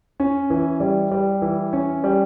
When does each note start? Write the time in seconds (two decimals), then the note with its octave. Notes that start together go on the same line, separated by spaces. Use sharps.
0.20 C#4
0.50 E3
0.80 G3
1.11 G3
1.42 E3
1.73 C#4
2.04 G3